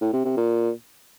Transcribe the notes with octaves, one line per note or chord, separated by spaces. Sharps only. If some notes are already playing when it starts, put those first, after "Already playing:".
A2
C3
C3
A#2